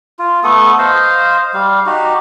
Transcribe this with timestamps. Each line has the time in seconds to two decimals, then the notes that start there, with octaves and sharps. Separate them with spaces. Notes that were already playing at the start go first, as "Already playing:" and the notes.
0.19 F4
0.44 A3 B3 A4 D#6
0.78 C5 D#5 F5
1.54 G3 F5
1.86 D#4 F#4 G4